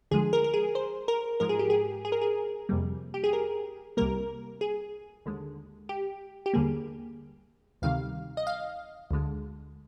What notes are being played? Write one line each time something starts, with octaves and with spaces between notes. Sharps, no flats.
D2 D3 F3 G#3 G#4
A#4
A#4
G#4
C5
A#4
G#2 F3 G#3 A#4
G#4
G4
G#4
G#4
A#4
G#4
F2 C3 G3 A#3
G4
G#4
A#4
C2 C3 G3 A#3 A#4
G#4
D#2 D3 G#3
G4
G4
D#2 D3 G3 A#3 G#4
D2 C3 D#3 G3 F5
D#5
F5
D2 D3 G#3